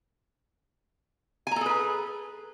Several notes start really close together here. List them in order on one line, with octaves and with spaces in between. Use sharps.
G#5 A#5 A4 G#4 B4